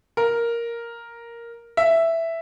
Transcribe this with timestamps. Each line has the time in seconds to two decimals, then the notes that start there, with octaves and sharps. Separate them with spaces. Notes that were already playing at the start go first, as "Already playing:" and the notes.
0.17 A#4
1.77 E5